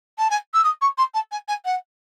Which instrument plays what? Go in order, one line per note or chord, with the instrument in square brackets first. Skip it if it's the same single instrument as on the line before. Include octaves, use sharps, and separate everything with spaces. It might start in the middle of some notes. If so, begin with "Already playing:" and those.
[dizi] A5
G#5
E6
D#6
C#6
C6
A5
G#5
G#5
F#5